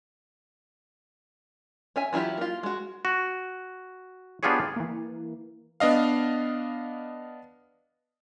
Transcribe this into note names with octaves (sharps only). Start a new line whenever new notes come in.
C#4 E5 G#5
E3 F#3 E4 F4 G4
A#3 F4
G#3 F#4
F#4
B3 D4 F4 G4 G#4 C#5
E3 A#3
B3 D4 D#5 F5